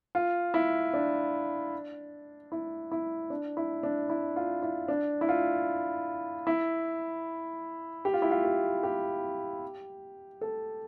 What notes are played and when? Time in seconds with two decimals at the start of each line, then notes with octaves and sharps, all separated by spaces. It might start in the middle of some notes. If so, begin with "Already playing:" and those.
0.15 F4
0.54 E4
0.93 D4
2.52 E4
2.91 E4
3.30 D4
3.57 E4
3.83 D4
4.09 E4
4.36 F4
4.63 E4
4.88 D4
5.21 E4
5.29 F4
6.47 E4
8.05 G4
8.13 F4
8.22 E4
8.31 F4
8.44 G4
8.83 G4
10.41 A4